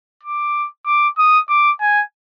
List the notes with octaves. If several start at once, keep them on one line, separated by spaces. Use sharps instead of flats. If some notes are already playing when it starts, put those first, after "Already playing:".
D6
D6
D#6
D6
G#5